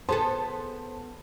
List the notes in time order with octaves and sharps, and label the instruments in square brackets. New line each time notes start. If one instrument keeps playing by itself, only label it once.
[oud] B3 G#4 A4 [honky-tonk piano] C5 A5 C6